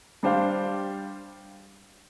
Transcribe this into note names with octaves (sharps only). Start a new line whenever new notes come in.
G3 D4 G4 C5 F5